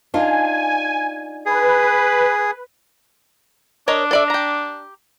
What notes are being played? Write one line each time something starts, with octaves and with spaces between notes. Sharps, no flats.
D4 D#4 F4 G#5
G#4 B4
D4 A#4 C#5 D#5
A4 D5 E5
G4 A#5